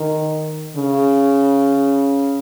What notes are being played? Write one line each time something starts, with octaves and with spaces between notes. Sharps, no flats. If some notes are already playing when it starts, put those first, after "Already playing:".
Already playing: D#3
C#3